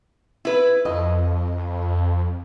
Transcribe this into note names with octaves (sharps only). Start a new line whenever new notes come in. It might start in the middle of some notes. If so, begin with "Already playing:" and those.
E4 B4
F2 D#5